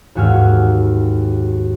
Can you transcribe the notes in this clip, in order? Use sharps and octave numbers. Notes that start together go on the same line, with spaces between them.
D#2 G#2 F#4 G#5 E6 F6